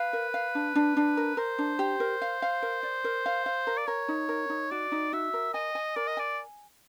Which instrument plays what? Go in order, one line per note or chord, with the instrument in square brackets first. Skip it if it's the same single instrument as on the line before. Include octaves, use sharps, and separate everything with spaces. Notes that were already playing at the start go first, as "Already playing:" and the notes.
Already playing: [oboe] B4 [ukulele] F5
[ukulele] A#4
F5
D4
D4
D4
A#4
[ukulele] A#4 [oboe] C5
[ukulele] D4
G4
A#4
F5
F5
A#4
D5
A#4
F5
F5
A#4
[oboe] D5
[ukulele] A#4 [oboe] C#5
[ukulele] D#4
A#4
D#4
[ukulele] F#4 [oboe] D5
[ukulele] D#4
[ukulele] F#4 [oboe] E5
[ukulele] A#4
[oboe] D#5 [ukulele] G#5
[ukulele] G#5
[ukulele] A#4 [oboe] D5
[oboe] D#5
[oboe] D5 [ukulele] G#5